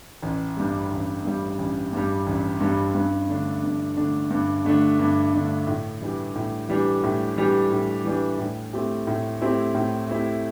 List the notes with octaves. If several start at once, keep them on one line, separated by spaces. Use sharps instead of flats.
A1
G2 G3
A1
G2 G3
A1
G2 G3
A1
G2 G3
G2
D3 A3 D4
G2
D3 A3 D4
G2
D3 A3 D4
G2
D3 A3 D4
A2
E3 G3 D4 G4
A2
E3 G3 D4 G4
A2
E3 G3 D4 G4
A2
E3 G3 D4 G4
A2
A3 C4 E4 G4
A2
A3 C4 E4 G4
A2
A3 C4 E4 G4